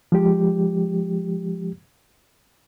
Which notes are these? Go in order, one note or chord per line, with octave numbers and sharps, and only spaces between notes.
F3 G#3 G4